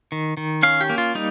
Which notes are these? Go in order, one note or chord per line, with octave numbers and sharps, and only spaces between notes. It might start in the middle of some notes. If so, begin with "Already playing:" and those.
D#3
D#3
C#4 F5
G4
A#3
F4
G3 D#4